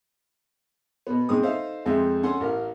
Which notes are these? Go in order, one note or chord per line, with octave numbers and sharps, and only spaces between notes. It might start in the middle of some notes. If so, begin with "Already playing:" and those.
B2 B3
G#2 G#3 C4 D#6
D#4 A4 C5 E5 F5
F2 G#3 C4 E5
C#4 A4 F#5 G#5 C6
A1 A#4